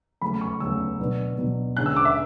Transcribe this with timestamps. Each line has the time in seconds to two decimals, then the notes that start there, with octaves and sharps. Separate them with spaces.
0.21 C#3 F#3 A3 C#4 B5
0.41 C#6
0.60 C#3 F#3 A3 C#4 E6
0.99 B2 F#3 B3 D4
1.38 B2 F#3 B3 D4
1.77 D3 G#3 C#4 F#6
1.86 E6
1.96 D6
2.05 E5